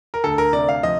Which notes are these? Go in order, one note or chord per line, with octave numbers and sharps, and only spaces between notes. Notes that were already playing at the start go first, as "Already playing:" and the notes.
A#4
D2 A4
A#4
C3 D5
F5
F3 D#5